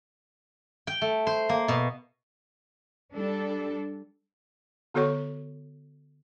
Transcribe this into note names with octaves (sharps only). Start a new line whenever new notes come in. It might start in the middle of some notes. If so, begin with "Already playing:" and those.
G5
A3
C5
A#3
B2
G3 D4 A4
D3 B3 F#4 A4 C#5 C#6